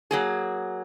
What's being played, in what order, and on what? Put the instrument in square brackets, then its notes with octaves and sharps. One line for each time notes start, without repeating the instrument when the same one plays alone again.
[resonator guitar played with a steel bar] F#3 A#3 G#4